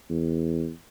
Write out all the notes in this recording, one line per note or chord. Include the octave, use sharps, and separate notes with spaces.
E2